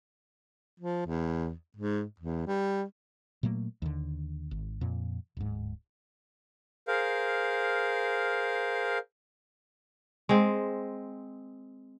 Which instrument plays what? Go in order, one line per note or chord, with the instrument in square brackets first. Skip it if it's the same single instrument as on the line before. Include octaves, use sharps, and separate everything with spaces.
[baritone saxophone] F3
E2
G#2
E2
G3
[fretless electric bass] A#2 F#3 A3 A#3
D#2 D3
G#1
F2 A#2
D1 G#2
[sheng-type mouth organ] G#4 A#4 C5 F5
[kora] G#3 C4